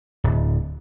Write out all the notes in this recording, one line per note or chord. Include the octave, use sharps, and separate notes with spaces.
D1